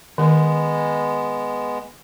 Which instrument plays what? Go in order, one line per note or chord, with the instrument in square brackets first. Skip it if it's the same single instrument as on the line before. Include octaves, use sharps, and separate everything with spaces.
[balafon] D#3 [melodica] G#3 B3